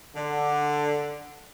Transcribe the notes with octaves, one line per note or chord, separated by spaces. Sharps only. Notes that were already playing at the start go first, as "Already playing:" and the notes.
D3